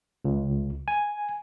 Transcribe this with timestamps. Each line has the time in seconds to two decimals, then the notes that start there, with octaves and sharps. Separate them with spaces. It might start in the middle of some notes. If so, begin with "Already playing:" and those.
0.25 C#2
0.88 G#5